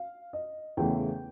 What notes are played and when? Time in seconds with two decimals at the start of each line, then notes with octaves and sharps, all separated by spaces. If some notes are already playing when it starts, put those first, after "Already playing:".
Already playing: F5
0.33 D#5
0.77 E2 C#3 E3 A3 G5